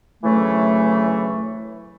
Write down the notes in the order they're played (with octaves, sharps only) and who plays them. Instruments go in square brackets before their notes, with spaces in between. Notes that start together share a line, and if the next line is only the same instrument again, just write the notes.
[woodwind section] D2 C#3 E3 F#3 A3